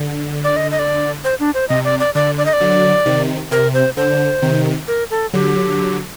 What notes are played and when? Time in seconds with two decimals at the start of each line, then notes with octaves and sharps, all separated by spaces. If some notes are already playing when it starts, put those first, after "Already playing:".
Already playing: D3
0.44 D5
0.56 D#5
0.71 D#5
0.79 D5
1.24 C5
1.40 D4
1.54 C5
1.69 C3 D#5
1.85 D5
2.00 D5
2.15 D3 D5
2.38 D5
2.45 D#5
2.53 D5
2.60 D3 F#3
3.06 C3 D#3
3.51 C3 A#4
3.74 C5
3.97 D3 C5
4.42 C3 D#3
4.88 A#4
5.11 A4
5.33 D3 F#3 G4